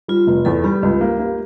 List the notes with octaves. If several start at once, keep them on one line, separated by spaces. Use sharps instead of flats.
G3 F4
F1
E2 A4
G3 G4
C#2
A#3
A#3